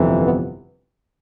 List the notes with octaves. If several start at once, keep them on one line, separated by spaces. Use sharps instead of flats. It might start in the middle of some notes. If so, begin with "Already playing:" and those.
Already playing: G1 F2 C3 E3
B3